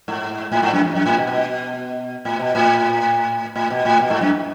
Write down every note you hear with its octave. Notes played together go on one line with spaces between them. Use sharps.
G#2
A2
G#2
F#2
E2
F#2
A2
B2
B2
A2
B2
A2
A2
B2
A2
B2
G#2
F#2